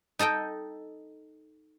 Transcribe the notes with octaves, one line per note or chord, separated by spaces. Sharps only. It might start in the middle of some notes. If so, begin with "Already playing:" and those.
D#4 A4 D#5 G5